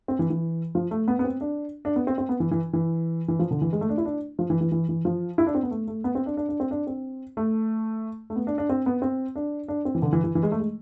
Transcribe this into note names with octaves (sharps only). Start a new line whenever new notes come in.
C4
E3
E3
F3
A3
B3
B3
C4
D4
D4
B3
C4
C4
B3
E3
E3
E3
E3
F3
D3
E3
G#3
A3
D4
E4
D4
F3
E3
E3
E3
E3
F3
E4
D4
C4
B3
A3
A3
B3
C4
D4
D4
D4
C4
D4
C4
A3
A3
B3
D4
D4
C4
B3
C4
D4
D4
C4
E3
D3
E3
E3
E3
G#3
A3
G#3